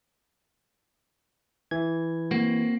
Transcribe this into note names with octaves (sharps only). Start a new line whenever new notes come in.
E3 G#6
A#3 C4 F#4